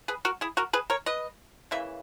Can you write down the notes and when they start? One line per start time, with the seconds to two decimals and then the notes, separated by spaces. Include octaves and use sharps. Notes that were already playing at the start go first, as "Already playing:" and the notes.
0.08 G#4 B4
0.25 F#4 A#4
0.41 E4 G#4
0.57 F#4 A#4
0.73 G#4 B4
0.90 A#4 C#5
1.06 B4 D#5
1.71 C#3 E3 A#3 E5